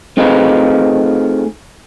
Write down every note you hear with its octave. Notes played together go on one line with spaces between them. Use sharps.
A3 C4 D#4 F4 G#4 B4